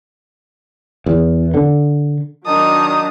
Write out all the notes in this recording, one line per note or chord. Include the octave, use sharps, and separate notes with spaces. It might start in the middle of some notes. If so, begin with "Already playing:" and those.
E2
D3
D#3 F#3 D4 D#4 A5 A#5 D#6